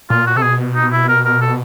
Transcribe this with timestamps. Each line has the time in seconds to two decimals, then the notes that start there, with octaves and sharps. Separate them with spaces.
0.10 A#2 F4
0.26 F#4
0.36 C3 A4
0.42 B2 G#4
0.75 D#4
0.92 E4
1.08 A#4
1.25 A#4
1.41 A4